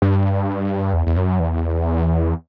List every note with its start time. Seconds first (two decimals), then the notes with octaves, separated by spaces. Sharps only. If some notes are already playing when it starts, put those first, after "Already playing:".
0.02 G2
0.93 E2
1.07 E2
1.16 F#2
1.39 E2